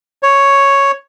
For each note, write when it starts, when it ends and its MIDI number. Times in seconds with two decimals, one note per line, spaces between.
0.23 0.91 73